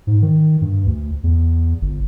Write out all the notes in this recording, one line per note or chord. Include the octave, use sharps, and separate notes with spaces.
G#2
D#3
G2
D2
E2
G1